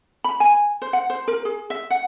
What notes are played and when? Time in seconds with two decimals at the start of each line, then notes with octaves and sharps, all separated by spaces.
0.24 B5
0.40 G#5
0.82 C5
0.93 F#5
1.10 C5
1.28 A#4
1.45 G#4
1.70 E5
1.90 F#5